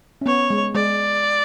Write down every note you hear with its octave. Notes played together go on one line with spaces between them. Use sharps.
C#4
B3 C#5
G#3
G#3 D5